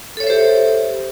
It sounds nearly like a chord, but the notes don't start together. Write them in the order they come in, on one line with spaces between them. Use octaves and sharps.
A4 C#5 E5 C5 G4